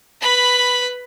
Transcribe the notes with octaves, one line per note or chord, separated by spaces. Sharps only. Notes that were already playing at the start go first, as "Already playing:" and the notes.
B4 B5